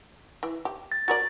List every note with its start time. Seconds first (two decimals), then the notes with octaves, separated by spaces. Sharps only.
0.43 E3
0.65 G4
0.92 A6
1.08 F#4 A#4 D5 A6